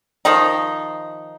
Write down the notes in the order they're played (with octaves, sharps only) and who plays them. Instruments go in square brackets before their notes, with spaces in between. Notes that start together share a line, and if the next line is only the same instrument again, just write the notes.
[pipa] D#3 F3 D#4